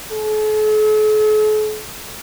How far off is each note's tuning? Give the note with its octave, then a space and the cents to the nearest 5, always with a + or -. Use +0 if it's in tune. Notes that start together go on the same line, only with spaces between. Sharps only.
A4 -45